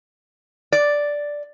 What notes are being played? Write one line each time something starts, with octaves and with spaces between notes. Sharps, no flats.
D5